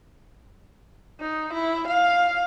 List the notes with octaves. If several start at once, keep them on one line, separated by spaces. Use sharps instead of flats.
D#4
E4
F5